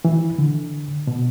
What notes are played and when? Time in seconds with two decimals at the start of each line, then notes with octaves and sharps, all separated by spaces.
0.05 E3
0.38 D3
1.07 B2